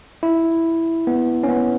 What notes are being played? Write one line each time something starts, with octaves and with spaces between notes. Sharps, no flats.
E4
B3
C#4
B3